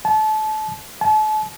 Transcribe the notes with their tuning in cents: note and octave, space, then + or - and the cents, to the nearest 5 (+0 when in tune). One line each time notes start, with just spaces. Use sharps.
A5 -30
A5 -40